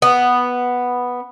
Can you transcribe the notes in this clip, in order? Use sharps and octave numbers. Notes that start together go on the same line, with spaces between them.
B3